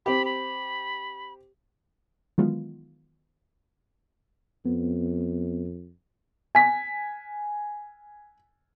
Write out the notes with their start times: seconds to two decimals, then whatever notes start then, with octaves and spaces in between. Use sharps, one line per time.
0.06 C4 G4 B5
0.25 B5
2.38 D#3 E3 F#3 G#3 B3 F4
4.65 F2 B3
6.55 G#5 B6